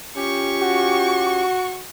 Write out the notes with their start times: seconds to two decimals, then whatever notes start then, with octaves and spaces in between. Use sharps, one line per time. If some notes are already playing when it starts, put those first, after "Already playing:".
0.17 C#4 F4 G4 C#6
0.61 F#4